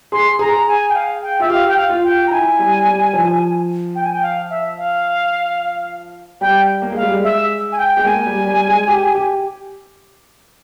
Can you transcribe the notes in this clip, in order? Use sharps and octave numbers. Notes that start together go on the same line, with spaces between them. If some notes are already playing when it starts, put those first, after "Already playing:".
G#4 C6
G#4 A#5
G#5
G5
F5
G5
F4 E5
G4 F5
G5
F5
F4
G5
A#5
E4 G#5
G3
G3
F3
G5
G#5
G5
F5
E5
F5
G3 G5
A#3
G#3 F5
G3
G#3
E5
G#5
G5
G#3 G5
A#3 G#5
G3
G3
G#3
G4
G4